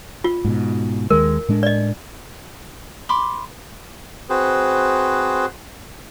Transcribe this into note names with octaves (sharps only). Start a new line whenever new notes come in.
F4
G#2 B2
D#2 D#3 G#3 A#4
A2 G#3 D4
D5 D#5
B5 C6 D6
C4 F#4 G#4 B4 C5